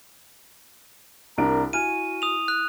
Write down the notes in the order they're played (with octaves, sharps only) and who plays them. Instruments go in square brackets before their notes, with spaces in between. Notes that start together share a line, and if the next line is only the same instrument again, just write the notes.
[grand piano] C2 D4 D7 [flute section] A#4 A#5
[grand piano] E4 G#5 F6 [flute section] F#4 [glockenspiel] D#7
[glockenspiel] D#6 F7
F#6